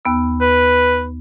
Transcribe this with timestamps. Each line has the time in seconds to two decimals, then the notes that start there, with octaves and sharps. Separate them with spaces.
0.05 D#2 B3 E6
0.41 B4